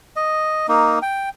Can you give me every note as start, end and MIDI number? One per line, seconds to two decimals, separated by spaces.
0.16 0.67 75
0.69 0.99 58
0.69 0.99 63
1.02 1.29 79